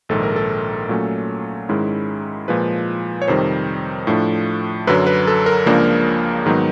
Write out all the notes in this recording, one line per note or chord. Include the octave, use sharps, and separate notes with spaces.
A#1 G#2 D#3 A4
A#4
A4
A#2 F#3 A3 C#4
G#2 D#3 G#3 C#4 E4
A#2 F3 G#3 B4
C#5
F2 C3 D#3 G3 C5
A2 F3 A3 D4
F#2 D3 F#3 B4
B4
A4
A#4
C#2 C#3 F3 A#3 D4
G#2 D#3 F#3 B3 D#4